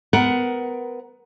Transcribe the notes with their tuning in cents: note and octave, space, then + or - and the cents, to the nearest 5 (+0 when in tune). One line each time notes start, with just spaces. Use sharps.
B3 +25 A#4 +20 F#5 +15